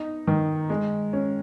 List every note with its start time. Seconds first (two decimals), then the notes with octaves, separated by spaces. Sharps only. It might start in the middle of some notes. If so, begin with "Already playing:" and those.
Already playing: B3 D#4
0.27 D#3
0.70 G#3
1.13 C#4